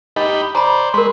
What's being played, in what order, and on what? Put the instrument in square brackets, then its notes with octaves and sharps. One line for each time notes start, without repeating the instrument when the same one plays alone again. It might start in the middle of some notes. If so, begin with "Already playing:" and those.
[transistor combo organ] D#4 G4 B5 [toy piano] D#5
[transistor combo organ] C5 D5 [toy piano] A#5 B5
[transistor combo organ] G#3 B5 [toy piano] A#4 C6